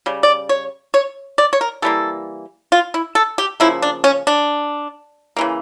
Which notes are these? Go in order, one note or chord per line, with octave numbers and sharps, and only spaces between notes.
C#3 G3
D5
C#5
C#5
D5
C#5
A#4
E3 G3 A#3 A4
F4
E4
A4
G4
C#3 F3 A#3 E4
D4
C#4
D4
C#3 E3 A#3